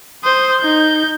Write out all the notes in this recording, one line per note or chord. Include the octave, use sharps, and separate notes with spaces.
C5 D#6
D#4 G6